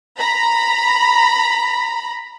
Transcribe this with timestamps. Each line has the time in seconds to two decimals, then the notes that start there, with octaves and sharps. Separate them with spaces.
0.19 A#5 B5